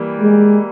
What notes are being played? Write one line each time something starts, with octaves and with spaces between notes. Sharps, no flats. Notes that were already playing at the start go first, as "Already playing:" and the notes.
Already playing: E3 G3 A#3
G#3